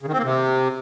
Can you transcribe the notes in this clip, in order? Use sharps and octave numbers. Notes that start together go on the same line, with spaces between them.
C#3
D#3
C4
A#3
C3